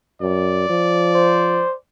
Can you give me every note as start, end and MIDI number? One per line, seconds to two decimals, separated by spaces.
0.21 0.67 42
0.21 1.78 74
0.69 1.62 53
1.14 1.75 72